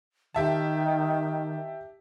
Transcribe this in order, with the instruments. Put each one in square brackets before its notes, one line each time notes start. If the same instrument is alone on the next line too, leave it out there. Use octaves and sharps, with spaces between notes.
[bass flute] D#3 [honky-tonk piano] G4 E5 A5